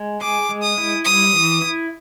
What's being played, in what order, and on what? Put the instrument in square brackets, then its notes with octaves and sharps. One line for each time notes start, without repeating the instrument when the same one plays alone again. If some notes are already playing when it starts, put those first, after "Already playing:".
Already playing: [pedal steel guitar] G#3
[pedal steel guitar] G#4 [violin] D6
[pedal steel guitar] G#3
[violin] D#6
[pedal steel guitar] E4
[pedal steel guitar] G3 [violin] D#6
[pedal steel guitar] E3
E4